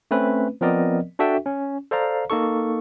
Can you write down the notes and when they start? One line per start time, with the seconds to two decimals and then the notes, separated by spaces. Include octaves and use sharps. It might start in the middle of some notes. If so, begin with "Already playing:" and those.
0.11 A3 C4 C#4 B4
0.61 F3 B3 C4 A#4 D5 D#5
1.19 D4 F#4 A4 E5 G5
1.46 C#4
1.91 A4 C5 D5 F5 A#5
2.30 A#3 D#4 A4 C#6